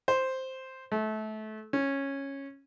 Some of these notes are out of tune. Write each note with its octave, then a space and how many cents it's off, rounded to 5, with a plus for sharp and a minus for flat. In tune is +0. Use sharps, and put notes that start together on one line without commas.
C5 +0
A3 -25
C#4 -10